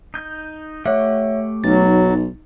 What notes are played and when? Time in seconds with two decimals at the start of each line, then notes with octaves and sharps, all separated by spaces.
0.14 D#4 G6
0.85 A3 G4 C#5 E5 F#5
1.64 B1 F#3 D#4 A6